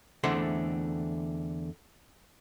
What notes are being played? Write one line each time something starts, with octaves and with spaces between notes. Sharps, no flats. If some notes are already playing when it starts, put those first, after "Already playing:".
E2 D3 A3 C4 F#5 C6